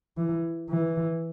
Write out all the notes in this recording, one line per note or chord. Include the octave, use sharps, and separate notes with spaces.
E3
E3